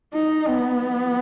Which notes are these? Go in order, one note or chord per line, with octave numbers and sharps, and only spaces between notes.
D#4
B3